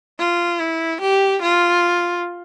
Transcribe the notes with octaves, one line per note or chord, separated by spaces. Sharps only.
F4
E4
G4
F4